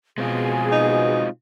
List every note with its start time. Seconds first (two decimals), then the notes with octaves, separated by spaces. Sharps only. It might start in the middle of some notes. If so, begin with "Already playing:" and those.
0.18 B2 G#3 C4 F4 G#4
0.72 D#4